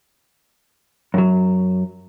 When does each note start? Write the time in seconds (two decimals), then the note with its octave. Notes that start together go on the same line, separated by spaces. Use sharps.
1.14 F#2 F#3